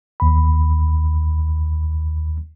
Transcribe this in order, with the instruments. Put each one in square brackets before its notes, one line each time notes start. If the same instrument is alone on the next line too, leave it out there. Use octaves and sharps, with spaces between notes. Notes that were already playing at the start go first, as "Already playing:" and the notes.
[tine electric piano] D#2 B5